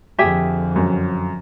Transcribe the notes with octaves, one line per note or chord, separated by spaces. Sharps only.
F2 D3 G4 G#4 E5
F#2